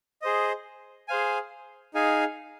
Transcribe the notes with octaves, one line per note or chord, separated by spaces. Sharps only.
G#4 C5 D#5
G#4 C5 F5 G#5
D#4 G#4 F5 G#5